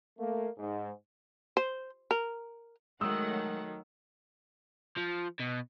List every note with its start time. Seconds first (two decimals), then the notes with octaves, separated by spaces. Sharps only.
0.18 A3 A#3
0.58 G#2
1.57 C5
2.11 A#4
3.01 D#3 F#3 G#3 A3 A#4 F#5 D#6 E6
4.97 F3
5.39 B2